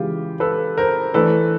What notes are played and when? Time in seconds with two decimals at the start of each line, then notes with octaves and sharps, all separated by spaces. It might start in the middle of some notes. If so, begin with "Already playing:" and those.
Already playing: C#3 E3 G#3 F4 G4
0.40 A4 B4
0.78 A#4 C5
1.14 E3 A3 D4 A4 B4